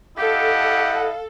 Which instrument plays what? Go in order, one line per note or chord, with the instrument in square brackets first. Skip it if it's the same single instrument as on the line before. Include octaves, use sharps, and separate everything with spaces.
[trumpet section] E4 D#5 F#5 [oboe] G4 [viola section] A4 [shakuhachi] F5